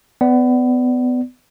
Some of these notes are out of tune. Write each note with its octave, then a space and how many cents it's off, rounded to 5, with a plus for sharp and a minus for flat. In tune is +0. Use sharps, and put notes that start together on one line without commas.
B3 +25 D5 -5